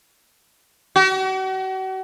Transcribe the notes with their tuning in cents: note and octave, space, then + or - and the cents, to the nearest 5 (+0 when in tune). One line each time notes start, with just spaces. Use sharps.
F#4 +40